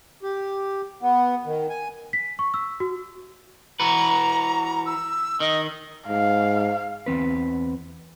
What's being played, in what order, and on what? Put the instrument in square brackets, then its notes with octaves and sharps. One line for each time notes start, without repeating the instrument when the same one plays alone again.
[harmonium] G4
B3
D#3
G#5
[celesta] B6
C#6
E6
F#4
[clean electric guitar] E3 F#4 B4 [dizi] A#5
[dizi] E6
[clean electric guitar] D#3 [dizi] D#5
[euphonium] G#2 [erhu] F5
[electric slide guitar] E2 C4 B4